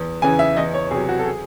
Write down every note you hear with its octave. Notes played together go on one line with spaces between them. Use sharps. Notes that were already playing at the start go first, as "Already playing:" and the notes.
Already playing: E2
C#3 E3 G#5
E5
E2 D#5
C#5
C3 F#3 G#4
F#4
A4
G#4